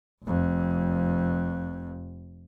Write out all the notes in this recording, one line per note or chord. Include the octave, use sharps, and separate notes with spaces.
F1 F2